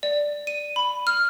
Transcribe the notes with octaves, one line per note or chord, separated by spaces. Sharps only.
D5
D#7
B5
F6